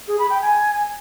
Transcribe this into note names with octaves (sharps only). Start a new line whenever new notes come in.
G#4
B5
G5
G#5